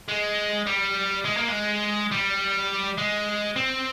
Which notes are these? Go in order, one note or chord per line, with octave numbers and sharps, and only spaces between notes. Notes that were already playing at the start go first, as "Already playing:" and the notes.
G#3
G3
G#3
A#3
G#3
G3
G#3
C4